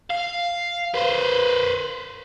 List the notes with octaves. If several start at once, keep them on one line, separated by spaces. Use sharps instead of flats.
F5
B4 C5